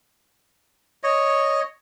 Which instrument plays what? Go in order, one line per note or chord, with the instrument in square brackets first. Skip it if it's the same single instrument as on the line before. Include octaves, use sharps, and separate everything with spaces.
[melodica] C#5 D#5